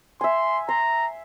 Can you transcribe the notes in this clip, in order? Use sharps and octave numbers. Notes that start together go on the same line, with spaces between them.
E5 G#5 C6
A#5 C6